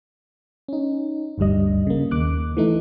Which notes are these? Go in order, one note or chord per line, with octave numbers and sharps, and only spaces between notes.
C#4 D#4
G1 D2 G2 G3 D#5
C#3 A#3
D#2 D6 F#6
E3 A3 D#4